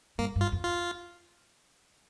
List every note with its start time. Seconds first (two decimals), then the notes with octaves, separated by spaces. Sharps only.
0.18 G2 A#3
0.35 G2
0.41 F4
0.52 F2
0.64 F4